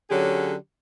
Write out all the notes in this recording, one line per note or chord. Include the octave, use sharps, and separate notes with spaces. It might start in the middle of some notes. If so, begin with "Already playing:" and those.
D3 F#3 C#4 G4 G#4